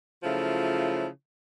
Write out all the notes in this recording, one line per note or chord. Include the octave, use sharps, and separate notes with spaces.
C#3 F3 F#3 A3 E4 F4